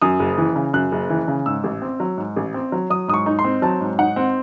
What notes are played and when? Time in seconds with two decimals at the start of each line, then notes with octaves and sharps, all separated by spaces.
0.02 F#2 D#6
0.20 F#1
0.38 E3
0.56 C#3
0.74 F#2 F#6
0.92 F#1
1.10 E3
1.28 C#3
1.46 G#2 E6
1.64 A1
1.82 C4
2.00 F#3
2.17 G#2
2.36 A1
2.54 C4
2.72 F#3
2.90 F#3 D#6
3.08 G#2 D#6
3.14 C#6
3.26 D#4
3.39 C6
3.44 C4
3.62 F#3 A5
3.81 G#2
3.98 D#4 F#5
4.16 C4